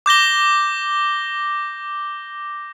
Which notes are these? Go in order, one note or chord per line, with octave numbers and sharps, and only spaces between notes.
D6 G6 A#6 G7